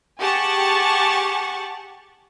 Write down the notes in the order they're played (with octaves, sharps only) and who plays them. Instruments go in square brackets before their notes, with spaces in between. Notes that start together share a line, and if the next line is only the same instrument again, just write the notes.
[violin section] G4 G#4 F#5 A5 C#6